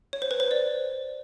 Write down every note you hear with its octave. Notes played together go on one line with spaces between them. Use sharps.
C#5
C5
B4
C5
D5